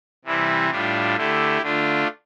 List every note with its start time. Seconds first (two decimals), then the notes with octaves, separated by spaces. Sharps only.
0.25 C3 E3 G3 C4 E4
0.70 A2 G3 D4 F4
1.16 D3 A3 E4 G4
1.62 D3 A3 D4 F4